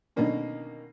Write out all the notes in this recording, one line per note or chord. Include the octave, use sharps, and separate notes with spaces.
B2 D3 D#3 A#3 C#4